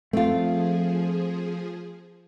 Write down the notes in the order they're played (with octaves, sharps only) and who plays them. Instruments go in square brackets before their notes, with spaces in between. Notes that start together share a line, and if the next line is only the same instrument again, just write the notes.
[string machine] F3 G#4 [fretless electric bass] A3 [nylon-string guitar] C4 F4